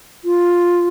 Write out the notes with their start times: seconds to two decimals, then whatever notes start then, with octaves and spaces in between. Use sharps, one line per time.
0.25 F4